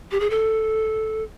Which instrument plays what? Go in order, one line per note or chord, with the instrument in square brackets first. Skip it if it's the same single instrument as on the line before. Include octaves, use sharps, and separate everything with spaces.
[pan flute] G4
G#4
A4